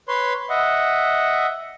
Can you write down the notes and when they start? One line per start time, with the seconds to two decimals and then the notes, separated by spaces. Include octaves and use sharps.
0.08 B4 C#5 C6
0.50 D#5 E5 F#5